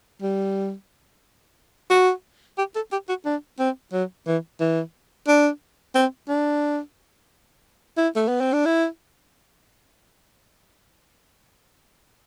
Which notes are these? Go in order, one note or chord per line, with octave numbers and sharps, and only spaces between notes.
G3
F#4
G4
A4
G4
F#4
D4
C4
F#3
E3
E3
D4
C4
D4
E4
A3
B3
C4
D4
E4